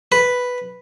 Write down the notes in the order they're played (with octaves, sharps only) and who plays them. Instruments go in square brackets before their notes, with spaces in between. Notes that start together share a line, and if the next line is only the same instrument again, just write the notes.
[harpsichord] B4